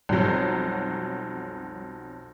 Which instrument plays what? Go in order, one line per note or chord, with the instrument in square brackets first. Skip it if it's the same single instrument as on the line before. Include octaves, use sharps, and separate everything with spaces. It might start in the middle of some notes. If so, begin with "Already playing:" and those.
[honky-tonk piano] B1 F2 F#3 [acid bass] G3